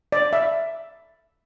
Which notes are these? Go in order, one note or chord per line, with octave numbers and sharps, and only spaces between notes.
D5
E5